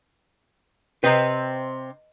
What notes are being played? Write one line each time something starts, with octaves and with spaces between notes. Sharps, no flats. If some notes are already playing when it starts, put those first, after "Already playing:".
C3 C4 B4 D#5